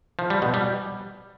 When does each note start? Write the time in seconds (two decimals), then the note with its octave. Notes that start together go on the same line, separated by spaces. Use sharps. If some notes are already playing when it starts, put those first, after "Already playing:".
0.19 F3
0.30 G3
0.42 B2
0.54 G3